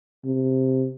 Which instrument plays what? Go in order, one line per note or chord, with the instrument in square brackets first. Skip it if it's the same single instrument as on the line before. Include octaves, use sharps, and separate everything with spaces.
[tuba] C3